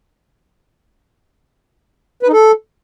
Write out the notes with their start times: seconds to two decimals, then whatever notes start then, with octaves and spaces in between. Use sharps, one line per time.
2.23 B4
2.28 D#4
2.33 A4